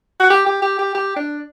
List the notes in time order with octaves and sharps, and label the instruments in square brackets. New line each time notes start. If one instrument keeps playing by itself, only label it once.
[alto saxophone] F#4
G4
G4
G4
G4
G4
D4